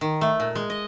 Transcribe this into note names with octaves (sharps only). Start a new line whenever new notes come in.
D#3
A3
A#2
G#3
D#5